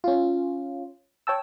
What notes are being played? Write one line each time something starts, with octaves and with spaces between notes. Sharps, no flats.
C#4 F4
C#5 G5 A5 E6